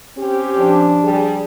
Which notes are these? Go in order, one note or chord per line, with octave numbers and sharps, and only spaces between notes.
C4 C#4 G4
F3 D4
G3 G#4